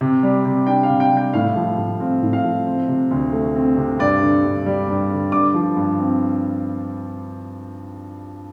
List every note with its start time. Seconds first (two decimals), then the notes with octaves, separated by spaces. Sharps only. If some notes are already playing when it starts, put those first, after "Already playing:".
0.01 C3
0.23 G3
0.45 C3
0.67 D4 G5
0.83 F5
0.90 C3
1.00 G5
1.11 G3
1.17 G5
1.33 A2 F5
1.56 F3
1.78 A2
2.00 C4 F5
2.22 A2
2.33 F5
2.44 F3
2.67 C4
2.88 C3
3.11 D2
3.33 A3
3.56 C4
3.77 C3
3.99 G2 D5
4.21 D3
4.44 G2
4.66 G3
4.88 G2
5.11 D3
5.32 G2 D6
5.54 F3
5.77 G2
5.99 C4